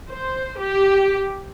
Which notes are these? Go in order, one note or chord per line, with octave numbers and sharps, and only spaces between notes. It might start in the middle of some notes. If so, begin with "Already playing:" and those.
C5
G4